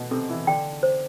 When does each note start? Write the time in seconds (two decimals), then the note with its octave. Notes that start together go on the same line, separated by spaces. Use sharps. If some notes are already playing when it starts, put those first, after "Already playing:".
Already playing: B2 A3 B3
0.11 C3 C4 A4
0.29 E3 E4
0.47 D3 D4 G5
0.83 C5